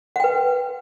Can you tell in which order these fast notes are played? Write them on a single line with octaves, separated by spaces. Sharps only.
F#5 G5 B4